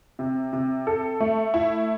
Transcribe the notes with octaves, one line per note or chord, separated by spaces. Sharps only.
C3
C3
A4
A3
E4